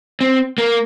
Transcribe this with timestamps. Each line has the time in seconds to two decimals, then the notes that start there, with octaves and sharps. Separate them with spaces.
0.21 C4
0.58 A#3